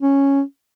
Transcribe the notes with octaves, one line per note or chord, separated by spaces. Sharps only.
C#4